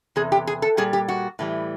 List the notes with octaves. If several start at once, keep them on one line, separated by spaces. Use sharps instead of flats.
E2 C3 G#4
G4
G#4
A4
A#2 G3 G#4
G4
F#4
A2 E3 G3